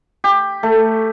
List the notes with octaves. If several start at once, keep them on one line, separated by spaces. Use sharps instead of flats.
G4
A3